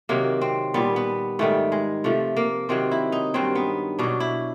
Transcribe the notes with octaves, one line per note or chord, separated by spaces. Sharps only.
C3 D#3 F#3 A#3
C4
A#2 G3 B3
B3
G#2 D#3 G3 A3
G#3
C3 F3 A3
A#3
C3 D#3 F#3 C4
E4
D#4
G2 D#3 F#3 C4
B3
B2 F#3 D4
E4